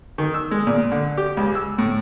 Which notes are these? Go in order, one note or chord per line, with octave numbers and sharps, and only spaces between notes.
D#3
E6
G#3
A#2
D3
G4
C#2
E6
A2